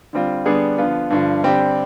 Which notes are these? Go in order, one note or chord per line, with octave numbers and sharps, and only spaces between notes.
D3 G3 C4 F4
D3 G3 B3 D4 G#4
D3 F3 B3 F4
G2 D3 F3
D3 G3 C4 G4